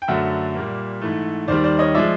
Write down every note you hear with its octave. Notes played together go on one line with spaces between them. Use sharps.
G5
F#2 D3 F#3 A3 E5 F#5
A#2 G3 A#3
G#2 E3 A3
D#2 D#3 G3 C5 D5
C5 D5
C#5 D#5
F3 G#3 D5 E5